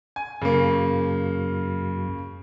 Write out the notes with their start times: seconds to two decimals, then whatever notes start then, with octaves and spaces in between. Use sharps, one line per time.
0.16 G#5
0.42 F#2 C#3 A#3